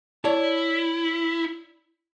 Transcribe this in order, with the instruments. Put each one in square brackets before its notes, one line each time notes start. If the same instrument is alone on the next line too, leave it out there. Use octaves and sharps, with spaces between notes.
[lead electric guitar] E4 [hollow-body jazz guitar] C#5 D5 A5